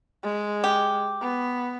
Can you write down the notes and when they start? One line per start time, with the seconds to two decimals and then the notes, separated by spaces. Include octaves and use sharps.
0.23 G#3
0.64 G4
1.21 B3